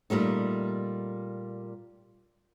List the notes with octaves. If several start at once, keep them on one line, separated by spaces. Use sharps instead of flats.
A#2 G3 A3 D#4